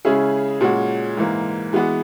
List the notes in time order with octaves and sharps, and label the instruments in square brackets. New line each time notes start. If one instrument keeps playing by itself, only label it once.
[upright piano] C#3 G#3 C#4 E4 G#4
A#2 G#3 C#4 F#4
G#2 E3 A#3
E3 G#3 B3 F#4